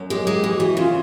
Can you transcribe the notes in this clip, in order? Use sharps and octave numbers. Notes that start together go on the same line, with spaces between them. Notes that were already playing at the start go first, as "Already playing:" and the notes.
Already playing: F#2
G#3 G4
G#3
G4
E3
F#4
E3
C#3 F4